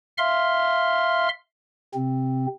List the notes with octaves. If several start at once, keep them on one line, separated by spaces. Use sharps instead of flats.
E5 F5 C6 F6
C3 C4